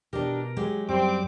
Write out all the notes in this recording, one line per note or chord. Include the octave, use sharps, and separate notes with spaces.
B2 D4 D#4 G4 A#4
F#3 G#3 G4
F#2 G3 C4 G4 D6